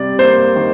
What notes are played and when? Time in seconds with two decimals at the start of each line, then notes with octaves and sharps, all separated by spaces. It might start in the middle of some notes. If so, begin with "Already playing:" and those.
Already playing: C3 G3 D5
0.19 A#3 C5
0.56 D#3